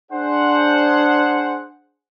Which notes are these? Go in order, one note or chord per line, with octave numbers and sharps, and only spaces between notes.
D4 G#4 C5 F#5